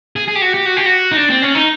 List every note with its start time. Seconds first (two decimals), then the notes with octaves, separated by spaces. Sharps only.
0.16 G#4
0.28 G#4
0.35 G4
0.42 F#4
0.54 G4
0.66 F#4
0.77 G4
0.86 F#4
1.12 D#4
1.17 D4
1.30 C4
1.42 C#4
1.55 D#4